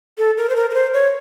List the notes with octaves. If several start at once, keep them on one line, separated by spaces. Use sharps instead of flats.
A4
A#4
C5
A#4
A#4
C5
C#5